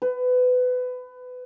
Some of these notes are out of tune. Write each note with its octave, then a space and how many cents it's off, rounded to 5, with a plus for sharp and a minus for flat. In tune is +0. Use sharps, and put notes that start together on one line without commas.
B4 +25